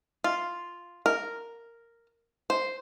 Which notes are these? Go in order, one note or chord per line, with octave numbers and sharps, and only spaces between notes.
F4
A#4
C5